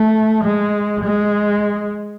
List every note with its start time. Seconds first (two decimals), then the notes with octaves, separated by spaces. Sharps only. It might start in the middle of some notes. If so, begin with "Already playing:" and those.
Already playing: A3
0.44 G#3
1.04 G#3